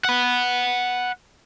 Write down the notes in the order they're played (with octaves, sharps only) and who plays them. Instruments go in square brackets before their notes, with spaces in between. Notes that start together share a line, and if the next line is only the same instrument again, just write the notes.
[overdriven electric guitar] F#5 B5